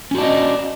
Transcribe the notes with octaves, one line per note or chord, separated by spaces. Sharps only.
C#4 D4 F#4 D#5